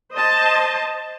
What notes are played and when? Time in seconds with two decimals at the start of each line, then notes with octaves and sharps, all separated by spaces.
0.14 C5 D#5 A5